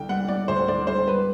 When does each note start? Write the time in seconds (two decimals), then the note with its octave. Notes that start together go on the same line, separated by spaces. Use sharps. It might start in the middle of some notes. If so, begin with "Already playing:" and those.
Already playing: C2 D3 G5
0.09 G3 F#5
0.28 G3 D5
0.48 D2 C5
0.67 D3 D5
0.87 G3 C5
1.07 G3 B4